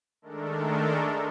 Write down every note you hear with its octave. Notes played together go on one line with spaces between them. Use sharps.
D#3 G#3 A3 D4 A4 A#4